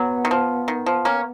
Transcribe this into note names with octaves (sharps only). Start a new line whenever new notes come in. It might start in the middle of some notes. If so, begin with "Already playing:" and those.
Already playing: F#3 B3
D#3
F3
D#3
F3
A#3 C#4